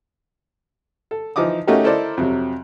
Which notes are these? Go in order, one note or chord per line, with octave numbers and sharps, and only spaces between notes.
A4
E3 F3 D#4 D6 D#6
A3 C#4 D#4 F#4 G4 A#4
E4 A4 A#4 C5 D5 D#5
F2 C3 F#3